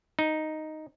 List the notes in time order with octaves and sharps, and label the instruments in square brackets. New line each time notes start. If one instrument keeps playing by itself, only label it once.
[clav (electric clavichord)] D#4